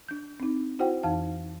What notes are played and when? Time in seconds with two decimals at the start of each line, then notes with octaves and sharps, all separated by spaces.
0.09 D4 G6
0.40 C4 D#4
0.79 E4 F#4 C5 F#5 G5
1.03 F2 E3 D#4 F5 A5